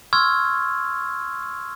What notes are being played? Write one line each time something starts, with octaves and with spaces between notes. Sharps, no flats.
C6 C#6 E6 F6 G#6